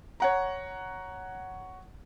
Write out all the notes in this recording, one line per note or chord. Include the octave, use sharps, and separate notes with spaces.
C#5 F#5 A#5